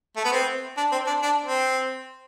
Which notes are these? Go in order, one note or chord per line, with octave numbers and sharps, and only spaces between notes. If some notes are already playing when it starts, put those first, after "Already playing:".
A3
B3
C4
D4
C4
D4
D4
C4